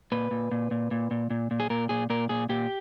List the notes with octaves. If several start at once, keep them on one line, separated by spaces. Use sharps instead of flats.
A#2 B4
A#2
A#2
A#2
A#2
A#2
A#2
A#2
G#4
A#2 A#4
A#2 G#4
A#2 A#4
A#2 G#4
A#2 G4